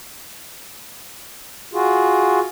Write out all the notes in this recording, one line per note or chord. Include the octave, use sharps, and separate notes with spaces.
F4 F#4 G#4